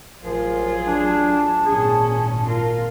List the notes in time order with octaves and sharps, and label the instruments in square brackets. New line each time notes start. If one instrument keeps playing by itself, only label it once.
[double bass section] A1 F#3 [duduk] F3 [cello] F4 G#4 [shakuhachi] A#4
[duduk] D4 [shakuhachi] A5
[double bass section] G#1 A#2 [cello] C#4 [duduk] G#4
[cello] F4 [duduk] A#4